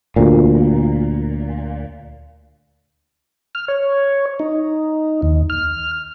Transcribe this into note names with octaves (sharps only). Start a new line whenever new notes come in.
D2 A#2
F6
C#5
D#4
D#2
F6